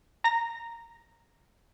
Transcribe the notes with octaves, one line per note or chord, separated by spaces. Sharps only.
A#5 A#6